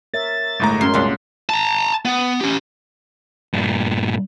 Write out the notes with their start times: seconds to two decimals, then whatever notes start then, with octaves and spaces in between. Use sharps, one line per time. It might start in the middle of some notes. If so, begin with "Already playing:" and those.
0.14 A#4 C#5 E5 A6
0.60 G1 A2 G#3 A3 A#5
0.81 F#2 C6
0.94 C2 A#2 G#3 A#3 D4
1.49 A5 A#5
2.05 B3
2.41 C#4 G4
3.53 G2 A#2